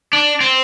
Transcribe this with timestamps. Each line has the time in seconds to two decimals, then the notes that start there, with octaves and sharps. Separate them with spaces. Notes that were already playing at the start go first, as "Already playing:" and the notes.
0.13 D4
0.40 C4